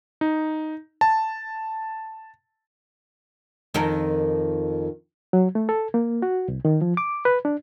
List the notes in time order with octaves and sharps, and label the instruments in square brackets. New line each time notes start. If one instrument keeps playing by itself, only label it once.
[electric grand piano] D#4
A5
[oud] F2 D#3 A#4
[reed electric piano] F#3
A3
A4
A#3
F#4
C2
D#3
F3
D6
B4
D4